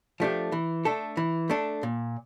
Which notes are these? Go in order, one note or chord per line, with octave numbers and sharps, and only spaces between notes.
F3 A3 D4 G4
E3
A3 D4 A4
E3
A3 D4 A4
A#2